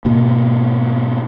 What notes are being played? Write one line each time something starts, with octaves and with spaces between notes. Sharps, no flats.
G#2 B2 A#3